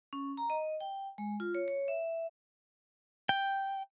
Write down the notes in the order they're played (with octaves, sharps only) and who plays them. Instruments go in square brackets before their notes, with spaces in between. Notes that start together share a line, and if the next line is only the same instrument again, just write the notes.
[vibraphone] C#4
A#5
D#5
G5
G#3
F4
C#5
C#5
E5
[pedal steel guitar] G5